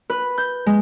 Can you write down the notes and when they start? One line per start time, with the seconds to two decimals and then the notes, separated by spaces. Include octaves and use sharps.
0.10 B4
0.38 G6
0.66 G#3